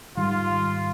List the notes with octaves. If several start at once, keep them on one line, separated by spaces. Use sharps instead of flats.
G#2 D#3 G3 F4